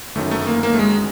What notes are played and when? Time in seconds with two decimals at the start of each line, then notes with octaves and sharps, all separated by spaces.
0.15 G1 F#2 D#3 A3
0.31 A3
0.47 A#3
0.63 A#3
0.74 A3
0.79 G#3